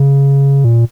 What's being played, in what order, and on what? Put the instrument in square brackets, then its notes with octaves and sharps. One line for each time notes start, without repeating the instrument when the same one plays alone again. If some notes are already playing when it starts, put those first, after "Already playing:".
Already playing: [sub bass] C#3
A#2